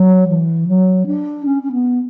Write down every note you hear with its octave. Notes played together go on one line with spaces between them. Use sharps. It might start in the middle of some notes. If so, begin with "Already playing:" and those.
Already playing: F#3
E3
F#3
D4
C#4
C#4
B3